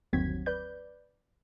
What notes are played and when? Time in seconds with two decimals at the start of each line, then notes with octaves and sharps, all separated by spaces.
0.13 G1 D#2 F#3 C4 G#6 B6
0.46 B4 D5 G6